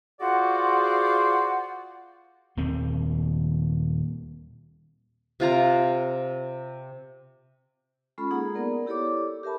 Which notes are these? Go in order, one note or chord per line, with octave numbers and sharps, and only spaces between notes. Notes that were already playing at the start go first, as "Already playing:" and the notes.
F4 F#4 G#4 C5 D5 F#5
D#1 D#2 D#3 C4
C3 F4 A#5
G#3 C#4 F4 A4 B5
A#3 D#4 G#4 F#5 A#5
B3 A#4 D5
E4 G4 A4 C#5 D5 D6
G4 A#4 E5 A5 B5